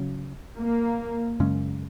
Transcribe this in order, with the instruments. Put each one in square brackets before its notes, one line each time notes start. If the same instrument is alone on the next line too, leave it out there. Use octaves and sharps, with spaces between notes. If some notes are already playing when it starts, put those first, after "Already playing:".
Already playing: [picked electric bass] C#3 F#3 C#4
[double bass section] A#3
[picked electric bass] F#2 C#3 G#3 C#4